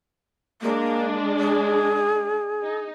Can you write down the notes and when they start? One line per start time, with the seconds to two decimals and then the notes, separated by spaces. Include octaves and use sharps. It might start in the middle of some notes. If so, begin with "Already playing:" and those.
0.62 G#3 A#3 D4
1.39 G#4
2.63 D#4